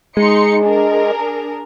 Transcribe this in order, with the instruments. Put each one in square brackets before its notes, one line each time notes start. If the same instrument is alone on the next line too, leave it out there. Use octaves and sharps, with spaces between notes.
[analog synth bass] G#3 [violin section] D#4 C6 C#7
[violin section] D4 G#4 A#4